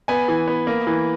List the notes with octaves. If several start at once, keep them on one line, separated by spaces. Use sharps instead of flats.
B3 G#5
E3
B3
A#3
E3